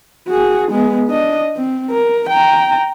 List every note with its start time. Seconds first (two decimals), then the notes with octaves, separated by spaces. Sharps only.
0.28 F#4 G#4
0.71 G#3 B3
1.08 D4 D#5
1.57 C4
1.90 A#4
2.30 G5 A#5